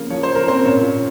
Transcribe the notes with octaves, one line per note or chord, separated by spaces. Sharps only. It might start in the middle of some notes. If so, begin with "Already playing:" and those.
Already playing: C#3 F3 A#3
F3 C#5
C5
C#3
A#4
A#3 C4 C5
A#2 C#4 C#5
A#2